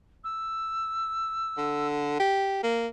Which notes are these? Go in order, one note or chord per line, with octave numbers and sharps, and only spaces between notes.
E6
D3
G4
A#3